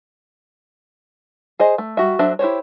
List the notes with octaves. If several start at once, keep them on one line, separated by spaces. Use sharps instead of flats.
G#4 C5 D#5
A3
G3 F#4 E5
F#3 D4 A4 C5 E5
E4 G4 C5 C#5